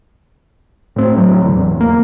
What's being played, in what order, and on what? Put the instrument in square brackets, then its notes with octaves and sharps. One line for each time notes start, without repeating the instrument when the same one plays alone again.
[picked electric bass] A2 C4
A2 F#3
F1 A2 D3
E2
A#3